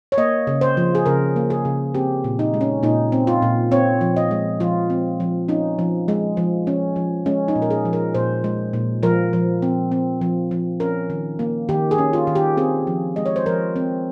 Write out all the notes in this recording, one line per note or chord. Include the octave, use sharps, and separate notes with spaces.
C#5
A#3 D#5
C#3
C5
F3
G#4
C#3 A#4
A#3
G#4
C#3
C4 G4
A#2
D#4
G#3
C#4
A#2 D#4
C4
F4
A#2
C4 C#5
F3
D#5
G#3
F3 F4
C4
F3
C#4 D#4
F3
G#3
F3
C#4
F3
G#3 C#4
D#4
A#2
A#4
G#4
F3
A#4
A#2 C5
G#3
A#2
F3 A#4
F3
C4
C4
F3
F3
C#4 A#4
D#3
A#3
D#3 G4
G#4
C#4
F4
D#3
G4
C4 G#4
F3
G#3 D#5
C#5
C5
F3 A#4
C4